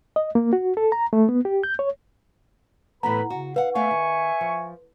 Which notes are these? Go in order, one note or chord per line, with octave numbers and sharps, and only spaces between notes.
D#5
A#3
F#4
A4
A#5
A3
B3
G4
G6
C#5
A2 E3 B3 A4 B4 A#5 B5
C#3 F#4
B4 F5 F#5
A3 B3 E5 F5 G#5 C#6
D#3
F3